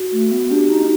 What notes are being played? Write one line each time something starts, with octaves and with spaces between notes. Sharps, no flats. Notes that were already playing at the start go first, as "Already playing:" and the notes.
Already playing: F#4
A3
B3
D4 G4
D#4